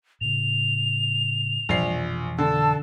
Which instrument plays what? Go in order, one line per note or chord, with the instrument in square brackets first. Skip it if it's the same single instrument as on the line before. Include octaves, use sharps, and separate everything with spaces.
[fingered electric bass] A2 C#3 [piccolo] F7
[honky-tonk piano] A#1 C7 [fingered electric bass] F2 B2 E3
[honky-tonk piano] D3 [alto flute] A5 [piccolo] E6